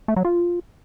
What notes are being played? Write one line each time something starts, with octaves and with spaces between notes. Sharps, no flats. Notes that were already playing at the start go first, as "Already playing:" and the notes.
A3
F#3
F4